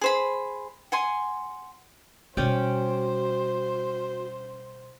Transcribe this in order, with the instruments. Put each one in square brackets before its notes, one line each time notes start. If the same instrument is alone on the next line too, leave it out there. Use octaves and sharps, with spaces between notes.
[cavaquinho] G#4 C5 B5
F#5 G#5 C6
[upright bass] B2 G3 [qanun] C#4 D5 G5 [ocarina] F#4 [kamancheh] C5